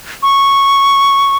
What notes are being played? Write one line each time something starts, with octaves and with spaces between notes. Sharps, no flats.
C#6